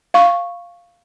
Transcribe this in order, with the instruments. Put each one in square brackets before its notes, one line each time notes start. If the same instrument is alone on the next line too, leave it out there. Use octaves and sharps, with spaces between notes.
[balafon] F5 C#6